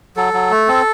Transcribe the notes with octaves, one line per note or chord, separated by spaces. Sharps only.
F#3 A4
F#3
A3
C4